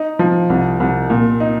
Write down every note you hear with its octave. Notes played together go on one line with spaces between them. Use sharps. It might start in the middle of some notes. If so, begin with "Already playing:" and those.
Already playing: D#4
F3
C2
C2
A#2
D#4